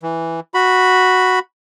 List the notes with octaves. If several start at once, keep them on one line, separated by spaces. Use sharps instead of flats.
E3
F#4 B5